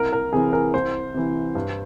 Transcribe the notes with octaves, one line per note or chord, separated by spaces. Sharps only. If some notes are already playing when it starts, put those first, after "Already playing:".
Already playing: C2 A#4
A#4
C3 E3 G#4
A#4
C2 C5
C3 E3
G2